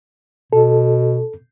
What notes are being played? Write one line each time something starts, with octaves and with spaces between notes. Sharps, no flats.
B2 A4